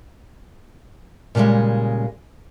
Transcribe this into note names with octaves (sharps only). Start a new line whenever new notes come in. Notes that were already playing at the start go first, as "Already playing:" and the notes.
A#2 C#3 F3 G3 G#3